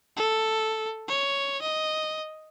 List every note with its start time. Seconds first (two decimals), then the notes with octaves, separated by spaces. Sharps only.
0.16 A4
1.08 C#5
1.62 D#5